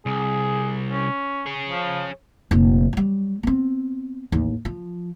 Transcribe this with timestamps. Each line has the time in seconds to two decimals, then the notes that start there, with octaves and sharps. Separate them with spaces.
0.06 C2 G#4
0.91 C#4
1.47 G#4 C#5
1.69 F3
2.51 F1 A#2
2.93 F#3 G3
3.43 B3 C4
4.32 A1 D#2
4.65 F3